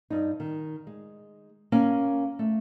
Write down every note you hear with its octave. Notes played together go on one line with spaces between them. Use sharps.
G2 D#4
D#3
G#3
A#3 C#4 G#5
A3